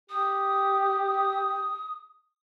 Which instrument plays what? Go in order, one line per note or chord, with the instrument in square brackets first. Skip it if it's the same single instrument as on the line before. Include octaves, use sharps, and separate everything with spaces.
[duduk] G4 [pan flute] D#6